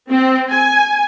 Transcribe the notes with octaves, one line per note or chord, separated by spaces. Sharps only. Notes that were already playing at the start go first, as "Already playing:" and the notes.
C4
G#5